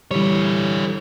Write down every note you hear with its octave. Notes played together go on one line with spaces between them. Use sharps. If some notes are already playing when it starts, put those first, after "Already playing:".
D3 E3 G3 C#5